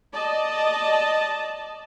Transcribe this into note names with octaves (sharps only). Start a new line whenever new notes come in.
D5 D#5 A5